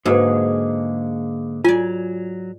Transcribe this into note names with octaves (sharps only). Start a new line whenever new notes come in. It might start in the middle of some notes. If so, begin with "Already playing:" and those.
G#2 D3 A#3 F#4 G#4 B4
F#3 F4 D5 G#5